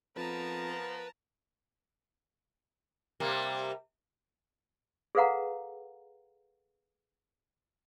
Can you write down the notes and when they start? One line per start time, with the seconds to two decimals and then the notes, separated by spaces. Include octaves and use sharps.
0.17 F2 F3 B3 A#4 B4 A5 A#5
3.20 C3 G3 A#3
5.15 G#4 A4 B4 F5 F#5 A#5